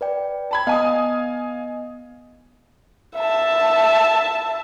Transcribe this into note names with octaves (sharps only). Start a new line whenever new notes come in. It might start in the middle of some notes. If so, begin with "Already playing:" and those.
B4 D5 G5
A5 B5 G#6
B3 D#5 F5 G#5 D#6
E5 A5